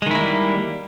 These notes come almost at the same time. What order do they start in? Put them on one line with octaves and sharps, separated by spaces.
G#3 D#3 E4 A#3 G3